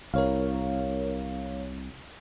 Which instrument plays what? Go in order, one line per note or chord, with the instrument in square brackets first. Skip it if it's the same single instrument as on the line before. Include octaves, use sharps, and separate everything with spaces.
[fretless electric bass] C2 [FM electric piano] A#4 C#5 F5